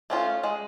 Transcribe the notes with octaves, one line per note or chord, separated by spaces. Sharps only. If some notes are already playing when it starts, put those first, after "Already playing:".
A3 C#4 F4
G#3